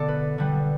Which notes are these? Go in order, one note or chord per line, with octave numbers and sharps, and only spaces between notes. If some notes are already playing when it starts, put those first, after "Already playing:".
Already playing: B2 D3 A3 B3 A4 D5
B4
D3 G3 B3